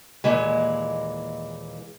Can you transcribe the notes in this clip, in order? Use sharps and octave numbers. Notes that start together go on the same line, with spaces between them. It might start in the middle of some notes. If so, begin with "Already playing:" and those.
D#2 A#2 E3 G#3